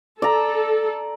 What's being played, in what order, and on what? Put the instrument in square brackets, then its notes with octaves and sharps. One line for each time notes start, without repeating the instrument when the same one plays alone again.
[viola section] A4 [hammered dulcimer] D5 A#5